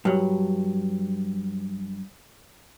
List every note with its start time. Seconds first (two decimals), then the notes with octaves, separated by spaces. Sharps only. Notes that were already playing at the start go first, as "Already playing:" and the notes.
0.05 G2 F#3